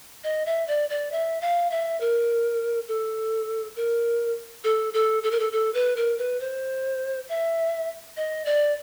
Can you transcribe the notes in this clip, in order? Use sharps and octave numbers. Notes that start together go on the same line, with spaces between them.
D#5
E5
D5
D5
E5
F5
E5
A#4
A4
A#4
A4
A4
A4
A#4
A4
A4
B4
A#4
B4
C5
E5
D#5
D5